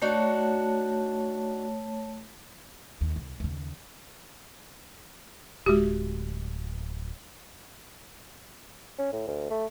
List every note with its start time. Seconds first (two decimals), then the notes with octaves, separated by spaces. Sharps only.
0.02 A3 D4 D#4 F#4 C#5 A5
3.01 D#2
3.16 C2
3.40 D#2 C#3
5.66 D1 G#3 F#4 G4
8.98 C#4
9.13 A2
9.27 D2
9.50 A3